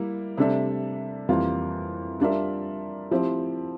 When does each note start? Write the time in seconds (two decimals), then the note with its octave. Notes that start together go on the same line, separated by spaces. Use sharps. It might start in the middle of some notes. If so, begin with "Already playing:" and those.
Already playing: G3 A#3 E4
0.37 C3 G3 D4 A4 E5
1.29 F2 E3 G3 A#3 F4
2.20 G3 D4 F4 A#4 E5
3.11 F3 C4 E4 G4